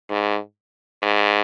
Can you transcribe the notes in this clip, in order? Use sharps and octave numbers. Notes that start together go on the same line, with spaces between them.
G#2
G#2